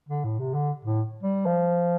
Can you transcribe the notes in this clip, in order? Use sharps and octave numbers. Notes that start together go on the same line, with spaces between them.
D3
A2
C3
D3
A2
G3
F3